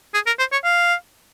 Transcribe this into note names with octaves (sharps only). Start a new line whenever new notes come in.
G#4
A#4
C5
C#5
F5